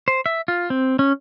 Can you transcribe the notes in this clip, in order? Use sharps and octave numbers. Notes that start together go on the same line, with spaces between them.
C5
E5
F4
C4
C#4